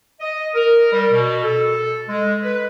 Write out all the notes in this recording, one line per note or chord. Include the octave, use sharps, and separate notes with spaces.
D#5
A#4
G3
B2
A4
G#3
B4